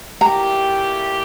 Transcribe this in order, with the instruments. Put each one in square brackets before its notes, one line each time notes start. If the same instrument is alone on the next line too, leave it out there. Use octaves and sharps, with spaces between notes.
[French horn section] A#2 A3 E4 G4 [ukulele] A#5